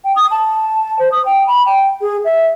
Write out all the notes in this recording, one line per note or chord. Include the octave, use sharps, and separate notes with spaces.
G5
D#6
A5
C5
D#6
G5
B5
G5
G#4
E5